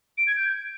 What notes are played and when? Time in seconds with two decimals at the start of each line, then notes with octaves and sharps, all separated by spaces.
0.18 D7
0.27 G#6
0.37 G6